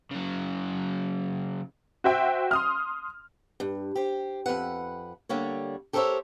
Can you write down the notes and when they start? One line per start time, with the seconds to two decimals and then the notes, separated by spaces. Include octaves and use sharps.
0.11 C#3 F#3
2.04 F#4 C5 E5 G5
2.51 C6 D#6 F6
3.60 G2
3.95 G4 C5
4.46 F2 F3 B4 F#5
5.29 D3 G3 A#3 C#5
5.93 G4 A4 A#4 C5 C#5 E5